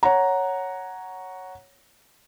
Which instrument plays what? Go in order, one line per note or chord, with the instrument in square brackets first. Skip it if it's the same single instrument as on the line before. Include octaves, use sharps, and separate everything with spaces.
[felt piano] C#5 F#5 A#5